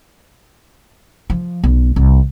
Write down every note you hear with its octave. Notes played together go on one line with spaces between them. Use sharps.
F3
B1
C2